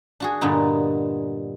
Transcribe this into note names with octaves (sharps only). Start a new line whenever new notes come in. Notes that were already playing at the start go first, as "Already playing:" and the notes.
D4 F#4 G#4
G2 A#2 D3 B3 D#4